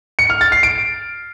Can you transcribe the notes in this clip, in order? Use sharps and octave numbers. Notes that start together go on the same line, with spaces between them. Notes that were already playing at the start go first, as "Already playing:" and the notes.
C#7
F6
A6
C7
D7